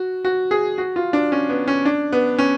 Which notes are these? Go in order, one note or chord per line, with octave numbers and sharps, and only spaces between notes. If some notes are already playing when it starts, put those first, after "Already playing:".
Already playing: F#4
F#4
G#4
F#4
F4
D4
C#4
B3
C#4
D4
B3
C#4